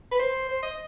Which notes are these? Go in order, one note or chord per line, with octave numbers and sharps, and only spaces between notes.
B4
C5
C5
D#5